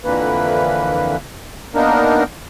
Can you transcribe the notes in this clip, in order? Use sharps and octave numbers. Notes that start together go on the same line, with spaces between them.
F2 D3 E3 A#3 B4
A#3 B3 D4 D#4 A#4